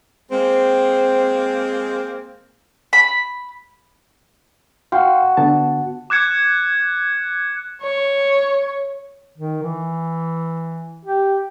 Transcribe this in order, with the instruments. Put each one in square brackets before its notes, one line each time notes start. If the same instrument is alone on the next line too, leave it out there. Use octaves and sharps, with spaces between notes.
[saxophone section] G#3 A#3 C4
[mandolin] B5
[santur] F#4 [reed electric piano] F5 G5 C6
[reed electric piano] D3 B3 A5
[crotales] D6 F#6 G#6 C#7
[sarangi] C#5
[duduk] D#3
E3
G4